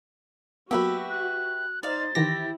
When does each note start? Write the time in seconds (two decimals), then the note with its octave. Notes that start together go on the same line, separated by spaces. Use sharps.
0.71 F#3 A#3 B3 F#4 G4 B4 E5 E6
1.10 F#6
1.83 D#4 C5 D5 F5 A6
2.15 D#3 E3 E4 G4 A#6